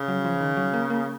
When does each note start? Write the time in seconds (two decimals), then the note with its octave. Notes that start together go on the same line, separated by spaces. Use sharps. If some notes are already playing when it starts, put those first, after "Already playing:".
Already playing: C#3
0.08 F#3
0.25 F3
0.41 D#3
0.57 F#3
0.73 A#3
0.90 A#3